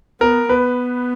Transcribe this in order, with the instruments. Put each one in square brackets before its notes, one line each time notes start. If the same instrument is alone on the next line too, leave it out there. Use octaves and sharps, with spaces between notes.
[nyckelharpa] B3 [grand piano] A#4
[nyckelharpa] B3 [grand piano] B4